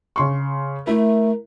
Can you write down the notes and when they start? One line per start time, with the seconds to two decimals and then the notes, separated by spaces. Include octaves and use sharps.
0.16 C#3 C6 C#6
0.87 A3 E4 A#4